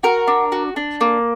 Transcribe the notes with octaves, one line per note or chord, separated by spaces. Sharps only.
F#4 A#4
D4
F#4
D4
A#3